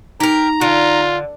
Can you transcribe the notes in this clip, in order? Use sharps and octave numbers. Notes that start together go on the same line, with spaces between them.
D#4 G4 A#4 A#5
D3 F4